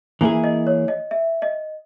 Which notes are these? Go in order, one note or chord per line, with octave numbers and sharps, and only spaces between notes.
E3 A#3 E4 G#4 G#5
D#5
C#5
D#5
E5
D#5